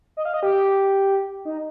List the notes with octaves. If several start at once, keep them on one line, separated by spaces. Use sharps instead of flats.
D#5
F5
D#5
G4
D#4